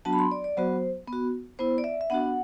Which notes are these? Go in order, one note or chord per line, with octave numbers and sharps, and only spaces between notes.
F#3 B3 D4 F#4 A5
B5
C6
D5
D5
F#3 B3 F#4 C5
B3
F#4
B3 E4 C5
D5
E5
E5
B3 D4 F#4 F#5